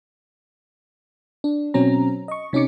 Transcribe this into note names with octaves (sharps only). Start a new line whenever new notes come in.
D4
B2 F#3 C4 C#4 A#5
D#5 C#6
C3 C#4 D#4 D6 C#7